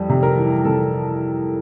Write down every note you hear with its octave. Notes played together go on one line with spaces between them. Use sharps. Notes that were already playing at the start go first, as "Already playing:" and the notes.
Already playing: F2 G3
C3
A#4
E3
C3 A4